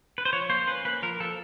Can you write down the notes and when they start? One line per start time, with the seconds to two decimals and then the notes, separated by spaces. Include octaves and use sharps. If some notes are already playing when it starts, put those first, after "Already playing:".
0.18 B4
0.25 C5
0.33 F3 C#5
0.49 A#3 C5
0.67 C#4 B4
0.85 A#3 B4
1.02 F3 A#4
1.20 F3 A4